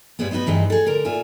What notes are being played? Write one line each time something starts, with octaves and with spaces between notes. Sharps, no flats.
G2 G3 G#3 B3
B3 D#4 E4 F#4 B4
G2 E3 G#3 D#4
G#4 A4
D3 A#4
A#2 F4 E5 G#5